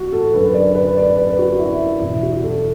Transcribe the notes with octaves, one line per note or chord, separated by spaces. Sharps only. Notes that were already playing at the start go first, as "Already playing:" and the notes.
Already playing: A2 E3 F#4
A4
F#2 D3 B4
D5
B4
D5
B4
F#4
E4
E2 B2 E4
F#4
A4